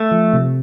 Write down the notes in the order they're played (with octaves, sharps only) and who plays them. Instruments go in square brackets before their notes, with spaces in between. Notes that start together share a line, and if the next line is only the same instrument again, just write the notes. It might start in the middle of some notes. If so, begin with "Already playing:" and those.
Already playing: [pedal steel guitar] A3
[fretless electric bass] F3
C3